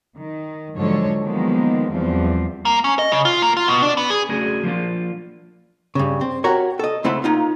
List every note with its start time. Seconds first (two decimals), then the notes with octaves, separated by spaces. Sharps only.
0.17 D#3
0.76 G#2 D3 F3 F#3 A4 C#5
1.22 D#3 F3 F#3 G#3 A#3 B3
1.91 E2 F3 G3 C4
2.65 A#3
2.84 C#4
2.99 D#5
3.12 C#3
3.25 F4
3.42 A#3
3.57 F4
3.68 B2
3.82 D4
3.97 B3
4.10 G#4
4.29 A3 C#4 D4 F#4 G#4
4.63 F3 A#3 D4 F4
5.95 G2 C#3
6.21 C4
6.44 F#4 G4 A#4 C#5
6.79 A4 D#5
7.04 C#2 A3 C4 E4 F#5 B5
7.24 A#3 D#4 F4